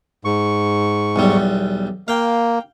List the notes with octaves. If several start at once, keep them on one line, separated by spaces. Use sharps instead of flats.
G#2 C#6
B1 E2 G3
A#3 F5 G5